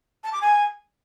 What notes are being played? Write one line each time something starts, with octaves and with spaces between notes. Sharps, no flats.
A5
D6
G#5